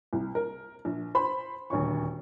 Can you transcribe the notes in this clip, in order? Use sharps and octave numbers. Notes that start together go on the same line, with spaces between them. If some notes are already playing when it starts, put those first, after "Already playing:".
C2
A#4
A#1
C5 B5
D#1 D2 C#5 C#6